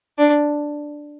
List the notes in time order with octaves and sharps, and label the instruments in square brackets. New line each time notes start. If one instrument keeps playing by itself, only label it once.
[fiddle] D4